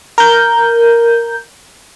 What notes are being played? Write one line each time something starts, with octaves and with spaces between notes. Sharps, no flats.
A#4 G6